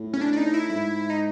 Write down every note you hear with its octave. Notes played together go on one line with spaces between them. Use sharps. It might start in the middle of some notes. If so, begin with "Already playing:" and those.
Already playing: A2
C#4
D4
D4
D#4
E4
G#2 E4
D#4